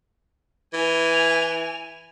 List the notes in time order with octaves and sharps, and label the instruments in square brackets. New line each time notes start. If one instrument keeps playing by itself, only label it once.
[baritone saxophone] E3 [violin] G#5 F7